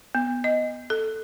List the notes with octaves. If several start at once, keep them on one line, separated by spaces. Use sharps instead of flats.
B3
D#5
A4